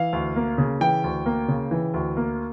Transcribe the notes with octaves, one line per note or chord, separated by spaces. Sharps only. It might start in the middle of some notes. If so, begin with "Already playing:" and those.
Already playing: E3 F5
D2
A#3
C#3
E3 G5
D2
A#3
C#3
E3
D2
A#3